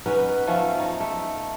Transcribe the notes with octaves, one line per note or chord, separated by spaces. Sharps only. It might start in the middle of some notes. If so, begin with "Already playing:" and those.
B3 C#4 D#4 B4
F3 A3 C#4
D#4
A3